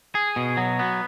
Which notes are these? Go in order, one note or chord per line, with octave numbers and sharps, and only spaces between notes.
G#4
B2
F#3
B3